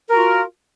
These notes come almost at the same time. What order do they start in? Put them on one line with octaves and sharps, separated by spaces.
A#4 F#4 F4